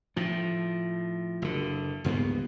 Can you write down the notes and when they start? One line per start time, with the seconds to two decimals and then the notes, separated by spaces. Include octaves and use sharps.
0.16 A2 F3
1.42 F#1 D3
2.04 C#2 G2 A#3 B3